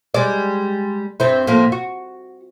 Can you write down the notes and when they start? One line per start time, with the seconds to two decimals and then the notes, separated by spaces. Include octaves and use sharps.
0.14 G3 G#3 D5
1.20 G2 C4 E4
1.47 A2 F3 A#3
1.72 F#4